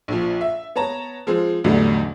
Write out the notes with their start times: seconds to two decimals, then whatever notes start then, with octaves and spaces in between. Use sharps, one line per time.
0.08 A#1 F3
0.41 E5
0.76 B3 C#5 A5 A#5
1.27 F3 G#3 C4
1.64 A1 E2 A2 D3 F#3 G3